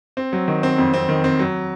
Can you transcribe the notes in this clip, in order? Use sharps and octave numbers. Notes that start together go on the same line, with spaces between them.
C4
F#3
D#3
C4
F2
C4
D#3
C4
F#3